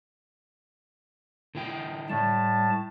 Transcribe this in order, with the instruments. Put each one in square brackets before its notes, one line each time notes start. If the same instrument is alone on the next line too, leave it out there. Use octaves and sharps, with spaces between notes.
[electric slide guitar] D3 E4 G5
[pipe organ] A2 A5 [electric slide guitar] G3